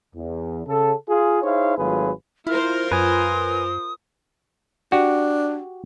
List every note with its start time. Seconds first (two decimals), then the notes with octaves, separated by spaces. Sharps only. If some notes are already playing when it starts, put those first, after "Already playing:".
0.15 E2
0.67 C#3 A4
1.08 F4 G#4
1.43 D#4 E4 G#4 C5 C#5 F5
1.77 G#1 F#3 A3 F4 G#4 B4
2.47 E4 F4 A#4 C5 F6
2.92 F#2 B4 G#5 D#6
4.92 D4 F#4 G4